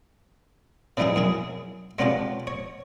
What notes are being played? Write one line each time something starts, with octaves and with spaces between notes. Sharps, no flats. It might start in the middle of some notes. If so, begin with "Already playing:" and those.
C#3 E3 G3 D#4 E4 G#4
F#2 E4 G#4
G#3 B3 C#4 D4 F4 G4
C#5